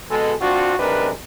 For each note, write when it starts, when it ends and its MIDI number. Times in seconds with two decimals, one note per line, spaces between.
0.11 0.34 47
0.11 0.34 56
0.11 0.34 69
0.41 0.77 60
0.41 0.77 62
0.41 0.77 65
0.41 0.77 66
0.79 1.11 35
0.79 1.11 48
0.79 1.11 56
0.79 1.11 62
0.79 1.11 70
0.79 1.11 71